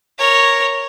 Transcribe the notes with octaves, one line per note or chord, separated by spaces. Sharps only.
A#4 C#5